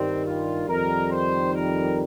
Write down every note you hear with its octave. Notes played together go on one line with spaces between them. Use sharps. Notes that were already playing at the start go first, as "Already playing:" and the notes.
Already playing: G2 D#3 G3 C4
F4
F2 D#3 G3 A#4
C5
A#4